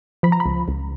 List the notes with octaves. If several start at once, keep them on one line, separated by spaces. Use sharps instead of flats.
F3 B5
A#5
B5
C#2
C#2